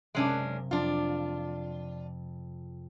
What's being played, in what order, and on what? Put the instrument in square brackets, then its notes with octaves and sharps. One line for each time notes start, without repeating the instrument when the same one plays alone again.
[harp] F#1 C3 B6 [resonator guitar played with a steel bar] G#3 C#4 D4
[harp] F2 [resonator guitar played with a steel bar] D4 F4